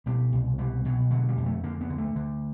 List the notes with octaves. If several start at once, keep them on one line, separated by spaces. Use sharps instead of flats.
B2 G3
C2
B2 G3
B2 F#3
D3 F#3
G3
F2
A3
D3 A#3
B3
D3
A3
D3